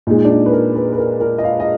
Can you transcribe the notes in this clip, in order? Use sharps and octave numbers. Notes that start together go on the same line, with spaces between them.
A#2 G#3 D#4
D4
D#4
B4
A#4
B4
B4
A#4
A#4
D#5
F5
D#5